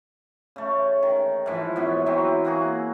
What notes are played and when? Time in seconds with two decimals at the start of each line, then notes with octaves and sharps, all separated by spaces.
0.56 C#3 A3
1.03 D#3
1.46 G#2 E3 F3
1.76 F#2 B3 E4
2.06 E3 F#3 C4
2.45 A#3 F#4 G#4